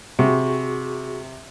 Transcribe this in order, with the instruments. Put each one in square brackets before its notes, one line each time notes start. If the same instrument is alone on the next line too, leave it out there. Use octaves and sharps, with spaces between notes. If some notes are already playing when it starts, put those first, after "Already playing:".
[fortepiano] C3 [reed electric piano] F#4 G#4 C#6